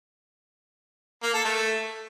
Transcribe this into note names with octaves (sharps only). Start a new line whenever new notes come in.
A#3
A4
A3